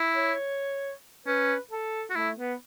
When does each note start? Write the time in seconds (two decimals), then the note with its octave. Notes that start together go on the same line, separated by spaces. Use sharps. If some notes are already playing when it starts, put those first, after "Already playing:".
Already playing: E4
0.15 C#5
1.27 C#4 B4
1.71 A4
2.10 F#4
2.16 A3 E4
2.38 B3